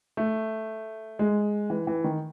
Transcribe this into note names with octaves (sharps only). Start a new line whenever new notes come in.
A3
G#3
E3
E3
D#3